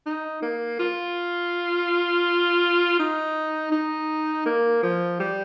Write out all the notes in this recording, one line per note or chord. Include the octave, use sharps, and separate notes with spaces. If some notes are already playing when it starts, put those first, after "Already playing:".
D#4
A#3
F4
D#4
D#4
A#3
F3
G3